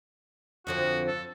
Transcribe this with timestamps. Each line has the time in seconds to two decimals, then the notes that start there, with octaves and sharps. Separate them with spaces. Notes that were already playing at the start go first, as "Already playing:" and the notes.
0.67 F2 D3 F3 F#4
1.08 A4